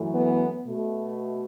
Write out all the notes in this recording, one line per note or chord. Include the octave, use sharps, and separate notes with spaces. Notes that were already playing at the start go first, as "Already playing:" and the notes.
Already playing: F#2 E3 A3
B3
B2 A3